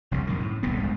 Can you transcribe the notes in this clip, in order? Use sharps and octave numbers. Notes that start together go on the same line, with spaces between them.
F1 C2 G2 C#3
F#2 B2 D#3
A2
D#1 C2 A2 B3
F1 G#2